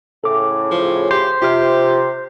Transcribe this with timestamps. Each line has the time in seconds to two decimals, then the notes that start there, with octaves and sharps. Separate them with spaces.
0.24 A2 C#3 A4 D6
0.71 F3
1.11 G4 C5
1.42 C3 F4 G4 F6